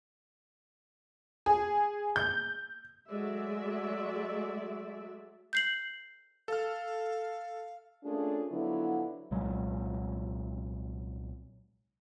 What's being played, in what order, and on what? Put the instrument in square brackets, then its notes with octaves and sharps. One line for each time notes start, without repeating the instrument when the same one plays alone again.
[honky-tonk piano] G#4
G6
[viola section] F#3 G#3 A3 D5 E5
[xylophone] G6 C7 F#7
[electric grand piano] A4 F6 [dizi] F5
[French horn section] A3 A#3 C#4 D4 F4 G#4
D3 F3 F#3 B3 E4
[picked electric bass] C2 A#2 F#3 G#3